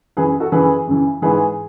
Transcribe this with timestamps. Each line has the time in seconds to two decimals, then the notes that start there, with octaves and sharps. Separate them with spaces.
0.17 F#2 E3 G#4 B4
0.29 G#4
0.40 F#4 A4
0.52 F#2 C#3 E3 G#4 B4
0.87 F#2 C#3 E3
1.22 G#2 E3 G#4 B4